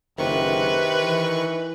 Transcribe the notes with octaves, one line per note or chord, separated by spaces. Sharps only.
F#1 C3 D#3 B4 C#6
E3